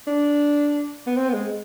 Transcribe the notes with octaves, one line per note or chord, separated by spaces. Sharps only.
D4
B3
C4
B3
G#3